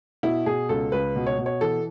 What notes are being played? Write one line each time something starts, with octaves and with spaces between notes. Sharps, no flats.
B2 E4
B2 G#4
C#2 A4
C#2 B4
B2
C#5
B2
C#5
E3 A4